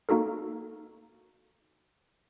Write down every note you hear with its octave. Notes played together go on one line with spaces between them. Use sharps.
A#3 D#4 F#4 A4 A#4